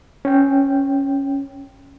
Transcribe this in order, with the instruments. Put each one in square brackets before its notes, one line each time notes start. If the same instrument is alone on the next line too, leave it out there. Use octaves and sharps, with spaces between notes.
[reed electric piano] C#4 G5